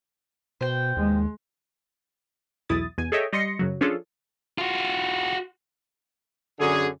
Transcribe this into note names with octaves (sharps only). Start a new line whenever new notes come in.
B2 C5 G5
D#2 G#3
B1 E2 E4 D#6 A6
E2 B2 G#5
G#4 A4 C#5 D#5 E5 G5
G3 D#5 C6 A#6 C#7
F#2 C#3 F#3
F3 C#4 D4 F4 G#4 A4
F4 F#4
F#2 D3 G#4